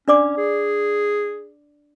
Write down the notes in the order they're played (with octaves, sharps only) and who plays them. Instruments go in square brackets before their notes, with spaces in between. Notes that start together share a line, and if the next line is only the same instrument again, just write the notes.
[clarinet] C#4 [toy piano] D4 D5 D6
[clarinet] G#4